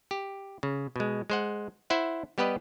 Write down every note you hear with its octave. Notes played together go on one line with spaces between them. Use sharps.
G4
C#3
B2 G#3
G#3 C5 F#5
E4 C5 E5 F#5
G3 B3 G4 B4 D#5